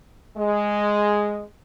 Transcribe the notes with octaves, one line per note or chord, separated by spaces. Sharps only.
G#3